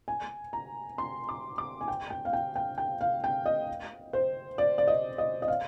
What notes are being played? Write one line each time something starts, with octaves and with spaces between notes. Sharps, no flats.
G#5
A#5
C6
D6
D6
G#5
G5
G5
F5
G5
G5
G5
F5
G5
D#5
C5
D5
D5
D#5
D#5
D#5
F5